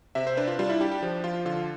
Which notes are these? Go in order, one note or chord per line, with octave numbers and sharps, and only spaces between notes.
C3 E5
C5
D4 B4
F4
G3 F4
E4
D4 G4
G4
F3 G4
F3 F4
D3 F4